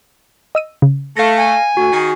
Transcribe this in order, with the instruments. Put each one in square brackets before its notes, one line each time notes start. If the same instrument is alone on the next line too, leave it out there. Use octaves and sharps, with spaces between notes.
[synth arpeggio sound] D#5 E6 D#7
C#3
[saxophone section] A3 [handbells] F5 A#6
[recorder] G#5
[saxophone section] D2 [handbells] F#4
[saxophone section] D#3 G#4